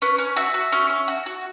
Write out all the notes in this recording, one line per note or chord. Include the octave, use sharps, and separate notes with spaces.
C#4 B4
C#4
F#4 E5
F#4
C#4
C#4
F#4
F#4